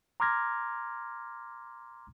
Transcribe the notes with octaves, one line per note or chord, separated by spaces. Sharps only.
A#5 C6 D6 F6 G#6 A#6